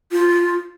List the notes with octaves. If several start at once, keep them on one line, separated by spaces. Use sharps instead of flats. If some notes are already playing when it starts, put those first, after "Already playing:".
F4